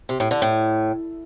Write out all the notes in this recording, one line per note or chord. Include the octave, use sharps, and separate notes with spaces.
C3
A2
D3
A2